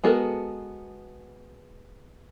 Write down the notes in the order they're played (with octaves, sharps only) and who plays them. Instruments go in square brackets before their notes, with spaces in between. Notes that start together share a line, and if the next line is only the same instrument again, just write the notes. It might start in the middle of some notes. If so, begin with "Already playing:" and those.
[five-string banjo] G#3 B3 F#4 A4 A#4